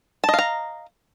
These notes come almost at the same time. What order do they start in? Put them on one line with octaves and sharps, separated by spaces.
A5 D#5 F5 A#5